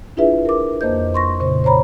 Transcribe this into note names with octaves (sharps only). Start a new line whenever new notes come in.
D4 E4 F4 G#4 B4 E5
A#4 D6
F2 A#3 C5 D#5 G6
C6 C#6 A#6
A#2 C#3 C5
C5 C#5 A#5 B5